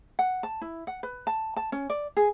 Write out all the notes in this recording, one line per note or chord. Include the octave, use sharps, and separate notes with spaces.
F#5
A5
E4
F#5
B4
A5
A5
C#4
D5
G#4